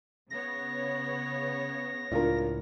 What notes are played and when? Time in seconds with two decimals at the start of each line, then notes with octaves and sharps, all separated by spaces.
0.30 C#3 B3 C#5 A#6
2.12 C#2 A2 D4 F4 A#4